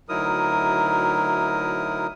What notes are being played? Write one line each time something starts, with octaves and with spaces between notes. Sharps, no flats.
D2 F#3 D#4 E4 A#4 D#6